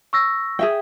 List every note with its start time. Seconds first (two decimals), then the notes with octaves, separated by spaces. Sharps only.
0.13 C#6 E6 A#6
0.59 G#4 E5 G5